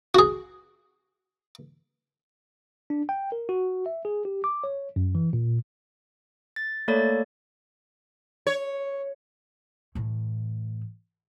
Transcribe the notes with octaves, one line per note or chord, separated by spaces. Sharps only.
F#4 G#4
D4
G5
A#4
F#4
E5
G#4
G4
D6
C#5
F#2
E3
A#2
A6
A3 A#3 A4 C#5 D5 A6
C#5
A2 E3